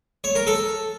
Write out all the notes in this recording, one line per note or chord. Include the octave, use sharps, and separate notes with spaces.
C#5
A#4
A4